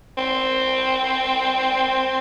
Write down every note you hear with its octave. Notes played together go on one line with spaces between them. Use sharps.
C4